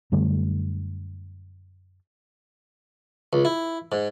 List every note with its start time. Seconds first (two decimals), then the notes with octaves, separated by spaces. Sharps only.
0.12 F#2 D3 G3 A3
3.33 C#2
3.45 E4
3.92 G#2